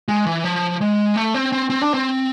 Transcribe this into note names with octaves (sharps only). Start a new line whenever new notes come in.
G#3
E3
F3
G#3
A3
C4
C4
C4
D4
C4